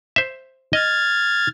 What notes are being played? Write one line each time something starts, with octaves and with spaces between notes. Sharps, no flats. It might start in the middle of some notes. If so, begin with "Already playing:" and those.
C5 E5
D#5 F6 G#6 A6